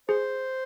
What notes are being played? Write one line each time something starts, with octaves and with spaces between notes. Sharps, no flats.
G#4 C5